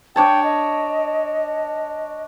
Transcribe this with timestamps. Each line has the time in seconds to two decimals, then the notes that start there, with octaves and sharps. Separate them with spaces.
0.16 D4 C#5 G5 A5
0.44 D#5